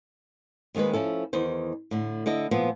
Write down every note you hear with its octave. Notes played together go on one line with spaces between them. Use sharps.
D#2 D#3 G#3 C4 B4
F3 C#4 E4 A4
E2 D#3 C5
A2 D3
D3 E4 A4 D#5
A#2 F3 B3